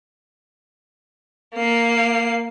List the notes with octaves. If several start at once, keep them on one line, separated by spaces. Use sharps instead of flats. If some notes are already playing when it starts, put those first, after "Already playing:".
A#3 C7